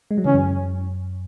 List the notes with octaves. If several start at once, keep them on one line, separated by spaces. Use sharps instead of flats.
G#3
F#3
C#3 E3 C#4
F#2